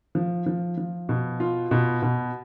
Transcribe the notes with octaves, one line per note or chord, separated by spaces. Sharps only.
F3
F3
F3
B2
F4
B2
B2